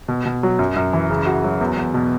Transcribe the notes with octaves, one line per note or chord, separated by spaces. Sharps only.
B2
B2
F#3
F#2
F#2
E3
C#3
F#4
F#3
E2
E2
B2